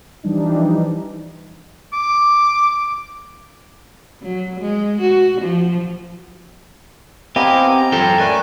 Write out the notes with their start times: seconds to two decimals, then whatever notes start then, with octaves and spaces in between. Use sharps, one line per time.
0.23 E3 F3 G3 D4 D#4
1.93 D6
4.22 F#3
4.60 G#3
5.01 F#4
5.41 F3
7.36 B3 C4 E4 G4 A#4 D#5 F5 G#5
7.77 A#5
7.92 E2 F#3 F4 A4 G5
8.19 A3 C#4 A#4 B4 D5 G#5